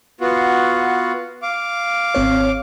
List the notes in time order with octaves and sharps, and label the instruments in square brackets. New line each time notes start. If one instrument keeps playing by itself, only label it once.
[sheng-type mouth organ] B3 F4 F#4
F5 D6
[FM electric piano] G#1 C4 C#5